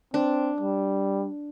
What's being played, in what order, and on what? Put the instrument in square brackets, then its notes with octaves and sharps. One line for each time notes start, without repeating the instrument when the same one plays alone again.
[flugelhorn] C4 [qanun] D4
[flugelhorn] G3